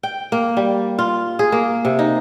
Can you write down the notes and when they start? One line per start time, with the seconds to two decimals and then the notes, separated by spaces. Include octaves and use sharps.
0.03 G5
0.32 A#3
0.57 G3
0.99 F4
1.39 G#4
1.52 A#3
1.85 C3
1.99 D#4